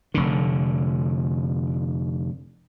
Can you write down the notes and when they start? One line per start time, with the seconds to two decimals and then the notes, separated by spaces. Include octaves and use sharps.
0.14 F1 D3